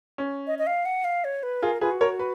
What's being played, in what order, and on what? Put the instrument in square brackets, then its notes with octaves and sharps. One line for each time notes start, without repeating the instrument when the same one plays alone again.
[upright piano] C#4
[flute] D#5
D#5
F5
F#5
F5
C#5
B4
[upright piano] F4 G#4 [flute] A#4
[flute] F4 [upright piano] G#4 B4
[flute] F#4
[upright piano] A#4 C#5
B4